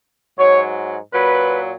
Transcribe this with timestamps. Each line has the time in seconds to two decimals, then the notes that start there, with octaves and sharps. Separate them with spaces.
0.38 G#2 F#3 C#5
1.12 A#2 F#3 B4